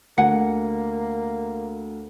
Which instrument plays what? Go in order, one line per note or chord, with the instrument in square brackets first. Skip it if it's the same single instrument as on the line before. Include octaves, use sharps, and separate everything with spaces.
[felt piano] D2 [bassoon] A#3 [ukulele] F#5 G#5